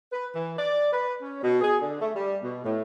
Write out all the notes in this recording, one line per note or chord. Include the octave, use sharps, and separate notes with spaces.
B4
E3
D5
B4
C#4
B2
G#4
D3
A3
G3
B2
A2